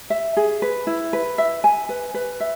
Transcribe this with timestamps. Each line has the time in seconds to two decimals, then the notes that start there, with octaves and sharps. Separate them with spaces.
0.10 E5
0.37 G#4
0.62 B4
0.87 E4
1.13 B4
1.38 E5
1.64 G#5
1.89 B4
2.14 B4
2.40 E5